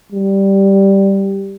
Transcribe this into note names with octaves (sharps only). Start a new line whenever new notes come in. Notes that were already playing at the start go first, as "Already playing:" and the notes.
G3